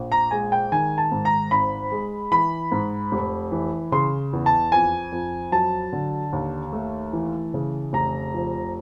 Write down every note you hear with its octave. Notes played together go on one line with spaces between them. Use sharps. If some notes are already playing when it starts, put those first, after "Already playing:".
Already playing: A#1
A#5
G#3 G#5
G5
D#3 G#5
A5
G#2
A#5
G#1 B5
G#3
E3 B5
G#2
F1
E3
C#3 C6
E2
A5
F2 G#5
F2
F#3 A5
D3
D#2
A3
E3
C#3
F1 A#5
F3